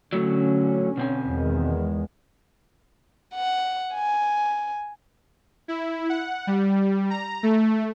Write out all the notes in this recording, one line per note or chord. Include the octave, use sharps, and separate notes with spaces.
D3 F#3 A3 C#4
B2 C4 G#5
E2 D#3 G#3
F#5
G#5
E4
F#5
G3
A#5
A3